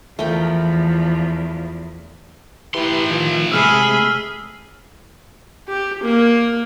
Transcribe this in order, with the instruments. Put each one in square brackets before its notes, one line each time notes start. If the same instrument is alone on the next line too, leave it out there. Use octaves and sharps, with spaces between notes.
[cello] E2 [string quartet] E3 F3 [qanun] A3 A#4 G5
[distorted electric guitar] A2 C6 [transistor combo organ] E4 G4 B4
[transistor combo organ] D#3 F3
[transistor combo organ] C3 G#3 A3 [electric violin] G#4 B5 [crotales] E6 F6 C7
[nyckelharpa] G4
A#3